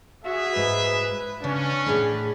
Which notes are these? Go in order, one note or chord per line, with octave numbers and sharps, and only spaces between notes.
F#4 G#4 E5
G#2 B4
C#3 C#4 D4
A2 G#4 B4